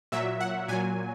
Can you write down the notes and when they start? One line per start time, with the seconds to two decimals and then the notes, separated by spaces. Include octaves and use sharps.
0.12 A#2 F#3 E5
0.40 F#5
0.68 A#2 F#3 G#5